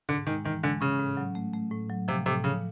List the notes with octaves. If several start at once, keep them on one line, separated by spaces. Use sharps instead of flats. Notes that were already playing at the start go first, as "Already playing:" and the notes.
G#2 D3
D#3 G#3
D#3 E3
D3 G#3
C#3 C#4
A2
F#3
A3
A3
A2
F#3
C3 F3
A2 C3
C#3 F3